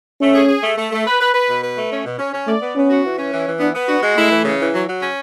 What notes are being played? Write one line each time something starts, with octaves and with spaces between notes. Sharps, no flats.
A3 C#4
G#4
G#4
A3
A3
A3
B4
B4
B4
B2
B4
A3
C#4
B2
C#4
C#4
A3 D5
B3
B3 C#4
F#4
E3
C#4
E3
E3
B3 D4
B3
D4 F#4
G#3
A3 E4
E3
C#3
E3
F#3
F#3
C#4